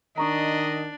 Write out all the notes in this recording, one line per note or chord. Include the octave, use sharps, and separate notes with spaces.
D#3 D4 D#5 A#5 C#6 D#6